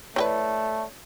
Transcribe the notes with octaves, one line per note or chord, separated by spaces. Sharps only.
E3 A3 G4 B4 C#5 D5